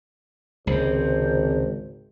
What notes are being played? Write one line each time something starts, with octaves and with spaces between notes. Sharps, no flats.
G#1 C#2 C3 C5